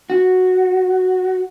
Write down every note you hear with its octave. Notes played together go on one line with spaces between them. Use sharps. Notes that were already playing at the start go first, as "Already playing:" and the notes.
F#4